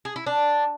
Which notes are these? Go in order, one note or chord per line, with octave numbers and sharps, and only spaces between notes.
G#4
E4
D4